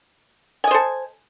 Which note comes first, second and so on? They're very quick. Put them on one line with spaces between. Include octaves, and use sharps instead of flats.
G#5 D#5 C5 A4